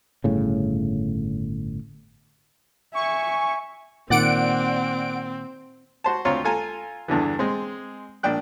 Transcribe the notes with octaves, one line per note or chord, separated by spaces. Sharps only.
G1 A2 C#3
E5 G#5 C#6
A#2 D#3 C4 D5 F#5 D7
F#4 C5 A5
D2 C4 F4 C#5 A#5 C6
F4 A4 G#5 A#5
E2 G2 D3 E3
G#3 C4
A#1 D4 G5 F#6